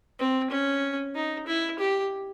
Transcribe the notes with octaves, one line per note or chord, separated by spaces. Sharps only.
C4
C#4
D#4
E4
G4